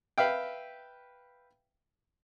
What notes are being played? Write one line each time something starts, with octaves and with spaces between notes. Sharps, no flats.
B4 E5 F5 G5